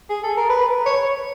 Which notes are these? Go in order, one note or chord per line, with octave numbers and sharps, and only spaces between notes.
G#4
A4
A#4
B4
C#5